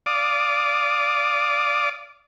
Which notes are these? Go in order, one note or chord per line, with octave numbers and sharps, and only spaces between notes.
D5 F5 D6 D#6